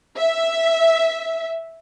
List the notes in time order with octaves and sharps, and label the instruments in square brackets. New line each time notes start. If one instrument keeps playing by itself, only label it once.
[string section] E5